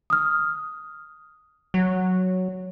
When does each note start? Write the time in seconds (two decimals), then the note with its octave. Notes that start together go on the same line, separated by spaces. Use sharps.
0.10 D#6 F6
1.74 F#3